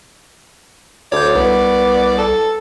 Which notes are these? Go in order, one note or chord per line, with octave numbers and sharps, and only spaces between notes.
D2 C#5 D5 G6
C2 B3
A4